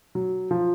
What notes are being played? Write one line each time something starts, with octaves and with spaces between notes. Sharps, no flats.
F#3
F3